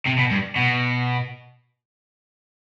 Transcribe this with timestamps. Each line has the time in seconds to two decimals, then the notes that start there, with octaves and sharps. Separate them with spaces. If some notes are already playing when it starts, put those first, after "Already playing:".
0.06 C3
0.18 B2
0.31 G2
0.56 B2